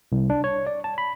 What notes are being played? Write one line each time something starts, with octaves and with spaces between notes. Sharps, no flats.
C2
D4
C#5
D5
A5
B5